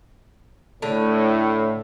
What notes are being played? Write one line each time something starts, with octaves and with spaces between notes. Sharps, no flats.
A2 D3